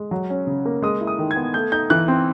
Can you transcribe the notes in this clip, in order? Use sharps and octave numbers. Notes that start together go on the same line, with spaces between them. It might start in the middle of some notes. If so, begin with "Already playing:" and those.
Already playing: G#3
F#3
C#4
C#3
A#3
G#3 D#6
E4
D#6
D#3
G#6
B3
A3 G6
D#4 G6
E3 F#6
C4